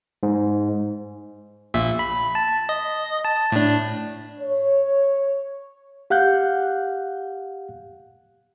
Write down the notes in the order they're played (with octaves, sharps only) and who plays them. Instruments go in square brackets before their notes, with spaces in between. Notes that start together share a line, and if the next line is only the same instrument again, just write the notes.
[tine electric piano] G#2
[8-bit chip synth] A#1 A#2 E5
B5
A5
D#5
A5
A2 D4
[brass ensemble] C#5
[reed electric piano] G4 F5 F#5 F#6 G6